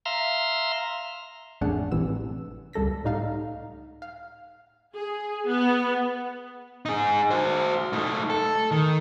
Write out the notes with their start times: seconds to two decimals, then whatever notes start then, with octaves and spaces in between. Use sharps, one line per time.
0.06 E5 F5 A#5 C6
1.61 A1 F2 A3 D4 G#4 F#5
1.92 A1 C3 E3 E6
2.73 C#2 G3 A4 A#6 B6
3.04 A2 G3 D#4 F5 A5
4.02 F5
4.95 G#4
5.48 B3
6.85 D#4 G#4
7.31 F#4 C5
7.93 A3 D#4
8.30 A4
8.71 D#3